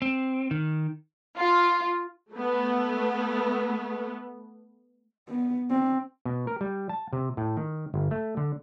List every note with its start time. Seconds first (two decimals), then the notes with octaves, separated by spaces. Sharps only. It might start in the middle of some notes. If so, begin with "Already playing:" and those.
0.02 C4
0.51 D#3
1.38 F4
2.32 A3 B3
5.28 B3
5.70 C4
6.25 B2
6.47 A#4
6.61 G3
6.89 A5
7.13 C3
7.37 A2
7.57 D#3
7.94 G1
8.11 A3
8.37 D3